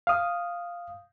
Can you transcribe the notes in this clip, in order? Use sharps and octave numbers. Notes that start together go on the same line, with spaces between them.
F5 D#6